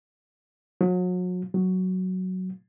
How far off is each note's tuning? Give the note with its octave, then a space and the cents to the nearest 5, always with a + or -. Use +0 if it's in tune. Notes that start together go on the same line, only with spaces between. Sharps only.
F#3 -35
F#3 +5